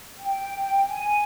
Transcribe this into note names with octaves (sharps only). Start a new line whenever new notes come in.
G5
G#5